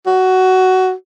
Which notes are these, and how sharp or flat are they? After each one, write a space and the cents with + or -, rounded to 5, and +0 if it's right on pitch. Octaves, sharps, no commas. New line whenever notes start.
F#4 +10